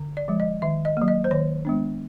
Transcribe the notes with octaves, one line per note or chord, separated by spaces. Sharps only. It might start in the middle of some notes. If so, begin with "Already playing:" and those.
Already playing: D3
D5
F3 G#3
D#5
D#3 E5
D#5
F#3 A#3
D#5
C5
D#3 C#5
G#3 B3 D4